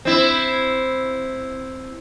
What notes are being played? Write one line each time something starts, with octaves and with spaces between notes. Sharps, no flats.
C4 E4